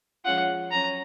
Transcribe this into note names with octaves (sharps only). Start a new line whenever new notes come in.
F3 G#3 C#4 F4 F#5
F#3 C#4 A#5